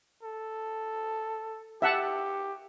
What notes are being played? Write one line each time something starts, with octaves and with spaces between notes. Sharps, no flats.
A4
G4 E5 F#5 A5